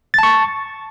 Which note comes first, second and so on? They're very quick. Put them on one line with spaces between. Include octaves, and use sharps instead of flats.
A6 A5 C#6